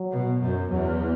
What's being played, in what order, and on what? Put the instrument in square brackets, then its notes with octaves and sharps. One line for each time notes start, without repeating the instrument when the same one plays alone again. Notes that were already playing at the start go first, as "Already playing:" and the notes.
Already playing: [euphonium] F#3
[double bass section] B2
F#2
[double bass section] E2 [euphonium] F#3